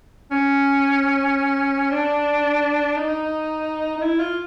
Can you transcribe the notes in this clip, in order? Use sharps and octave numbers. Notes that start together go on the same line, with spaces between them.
C#4
D4
D#4
D#4
E4
F4